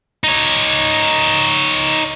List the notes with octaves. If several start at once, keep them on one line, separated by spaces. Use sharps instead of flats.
D#4 C#5